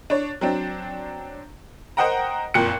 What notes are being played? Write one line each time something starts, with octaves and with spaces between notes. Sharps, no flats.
D4 C#5
F#3 C4 D4
A#4 C5 D#5 F#5 G5 A#5
F#1 F2 A#2 G5 F#6 C#7